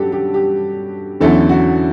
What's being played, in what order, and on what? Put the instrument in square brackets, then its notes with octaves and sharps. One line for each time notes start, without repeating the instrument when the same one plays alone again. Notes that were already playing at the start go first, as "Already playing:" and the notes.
Already playing: [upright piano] G2 F#3 C#4 G4 A4
G4
G4
E2 D3 F#3 C#4 E4 A4
F#4